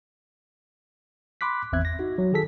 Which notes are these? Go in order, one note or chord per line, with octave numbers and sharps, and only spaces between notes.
B5 C6 D6 F#6 B6
G#1 E2 C4 E5 F#6 G#6
A#6
D#4 F#4
F#3
D#3 F#4 G#4 A4 B6